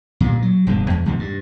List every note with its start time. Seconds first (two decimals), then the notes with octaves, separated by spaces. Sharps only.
0.20 G2 A#2
0.42 F#3
0.67 E1 G2 B2 G#3
0.90 E2
1.06 E2 G#2 C3 D#3
1.19 G2